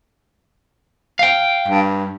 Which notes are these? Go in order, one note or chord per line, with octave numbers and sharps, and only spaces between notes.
F5 G5
G2